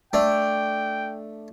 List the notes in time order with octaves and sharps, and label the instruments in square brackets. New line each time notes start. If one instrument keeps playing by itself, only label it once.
[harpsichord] A3 D4 [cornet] G5